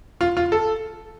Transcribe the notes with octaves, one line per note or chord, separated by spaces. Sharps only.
F4
F4
A4